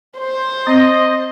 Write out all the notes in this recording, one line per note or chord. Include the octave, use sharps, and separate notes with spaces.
C5
C4 D#5